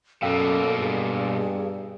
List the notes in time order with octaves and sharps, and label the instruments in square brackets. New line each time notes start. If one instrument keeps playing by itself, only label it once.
[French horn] F#2 [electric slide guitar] B2 A#3 [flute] A4 [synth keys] F5 G5 E6
[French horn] G2 [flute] G#4